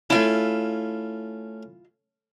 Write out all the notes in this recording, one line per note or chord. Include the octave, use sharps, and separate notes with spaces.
A3 C#4 E4 F4